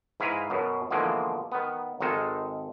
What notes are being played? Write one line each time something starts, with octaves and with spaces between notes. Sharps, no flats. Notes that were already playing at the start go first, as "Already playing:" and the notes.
G#2 E4 B4 F5 G#5 A#5
F#2 B2
B2 D3 E3 F3 G#3 A#3
D#3 B3
G#1 D#3 G#3 D#4 A4